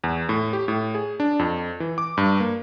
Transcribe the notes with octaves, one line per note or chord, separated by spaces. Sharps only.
E2
A2
G4
A2
G#4
D4
F2
E3
D6
G2
A#3